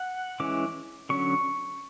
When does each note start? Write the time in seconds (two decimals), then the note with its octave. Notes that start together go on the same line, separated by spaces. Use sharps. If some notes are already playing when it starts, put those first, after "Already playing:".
Already playing: F#5
0.40 E3 G#3 C#4 D6
1.09 D3 F#3 C#4 C#6